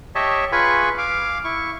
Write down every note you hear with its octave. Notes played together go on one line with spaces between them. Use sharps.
G4 C#5 D#5 E5 A5
F4 G#4 B4 G#5 B5 C#6
F5 D6
E4 C#6